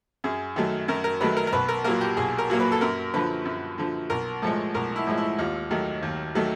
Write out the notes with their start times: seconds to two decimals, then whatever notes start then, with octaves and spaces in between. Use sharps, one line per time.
0.24 F#2 G#4
0.56 D#3 F#3 A3
0.88 F#2 A#4
1.04 A#4
1.21 D#3 F#3 A3 B4
1.37 A#4
1.47 A#4
1.53 B1 B4
1.69 A#4
1.84 A#2 F#3 A#3 A#4
2.01 G4
2.17 B1 G#4
2.38 A#4
2.50 A#2 F#3 A#3
2.60 B4
2.72 A4
2.81 F#2 A#4
3.14 D3 F3 B4
3.45 F#2
3.78 D3 F3
4.10 B1 A#4
4.42 A2 F3 G#3 A4
4.74 B1 A#4
4.96 E4
5.07 A2 F3 G#3
5.18 E4
5.38 D#2 F4
5.71 D#3 F#3 A3
6.03 D#2
6.35 D#3 F#3 A3